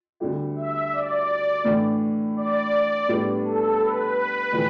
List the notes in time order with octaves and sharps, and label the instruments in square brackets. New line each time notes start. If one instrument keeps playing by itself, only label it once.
[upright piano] D2 D3 G3 E4 G4
[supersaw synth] E5
D5
[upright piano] A2 E3 A3 D4
[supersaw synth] D5
D5
[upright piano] A2 G3 B3 D4
[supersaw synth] A4
B4
B4
[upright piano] A2 E3 G3